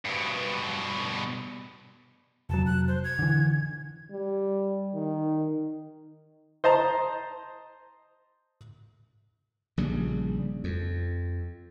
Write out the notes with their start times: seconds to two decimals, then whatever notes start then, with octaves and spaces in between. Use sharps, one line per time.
0.05 G2 B2
2.50 F1 F#3 A5
2.66 F#6
2.88 C5
3.04 G#6
3.19 D3 E3
4.11 G3
4.94 D#3
6.64 C5 D#5 A5 A#5
9.78 A#1 C#3 G3
10.64 F2